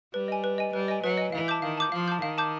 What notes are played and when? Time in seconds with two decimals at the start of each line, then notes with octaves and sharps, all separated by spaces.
0.14 G3 B4
0.28 D#5 G#5
0.44 B4
0.58 D#5 G#5
0.73 G3 B4
0.88 D#5 G#5
1.03 F#3 B4
1.18 D#5 G#5
1.32 E3 F5
1.48 A5 D6 G6
1.62 D#3 F5
1.77 A5 D6 G6
1.92 F3 F5
2.08 A5 D6 G6
2.22 D#3 F5
2.38 A5 D6 G6